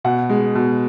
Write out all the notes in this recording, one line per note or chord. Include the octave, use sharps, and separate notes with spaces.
B2 F#5
G#3
B2